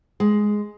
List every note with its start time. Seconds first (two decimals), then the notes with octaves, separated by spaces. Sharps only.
0.20 G#3